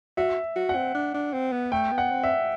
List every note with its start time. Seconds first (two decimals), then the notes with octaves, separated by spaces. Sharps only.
0.17 F#4 E5
0.56 F#4
0.69 F#5
0.75 C4
0.95 D4
1.14 D4
1.33 C4
1.52 B3
1.72 A3 G5
1.91 B3
1.98 F#5
2.11 C4
2.23 E5